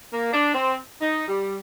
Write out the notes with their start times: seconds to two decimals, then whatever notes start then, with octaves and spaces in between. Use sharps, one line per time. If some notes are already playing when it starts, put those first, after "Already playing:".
0.11 A#3
0.32 D4
0.53 C4
1.00 D#4
1.26 G3